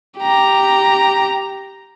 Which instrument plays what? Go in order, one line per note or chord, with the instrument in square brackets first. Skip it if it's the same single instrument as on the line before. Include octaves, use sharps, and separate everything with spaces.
[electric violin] G4 A#5